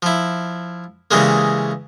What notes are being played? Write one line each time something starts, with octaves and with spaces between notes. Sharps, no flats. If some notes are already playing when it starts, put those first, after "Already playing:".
F3 E4
C#3 E3 G3 G#3 A#3